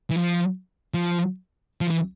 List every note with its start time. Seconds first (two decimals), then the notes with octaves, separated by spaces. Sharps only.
0.11 E3
0.16 F3
0.94 F3
1.81 F3
1.90 E3